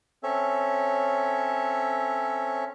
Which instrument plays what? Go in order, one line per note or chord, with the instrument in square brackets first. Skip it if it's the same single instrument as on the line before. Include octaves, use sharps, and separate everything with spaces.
[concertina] C4 C#4 A4 C#5 E5